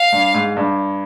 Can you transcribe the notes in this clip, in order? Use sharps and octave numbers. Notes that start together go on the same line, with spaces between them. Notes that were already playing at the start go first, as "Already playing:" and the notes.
Already playing: F5
G2
G#2
G2